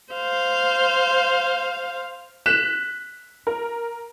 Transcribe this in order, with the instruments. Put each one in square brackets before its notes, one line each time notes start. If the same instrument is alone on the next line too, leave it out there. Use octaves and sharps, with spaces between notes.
[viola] C5 F5
[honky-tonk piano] F#6 B6 E7
A#4